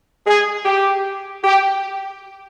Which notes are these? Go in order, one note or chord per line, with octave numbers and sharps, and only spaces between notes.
G#4
G4
G4